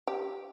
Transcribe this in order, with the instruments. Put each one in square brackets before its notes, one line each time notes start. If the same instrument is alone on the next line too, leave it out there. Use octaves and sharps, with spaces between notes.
[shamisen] G4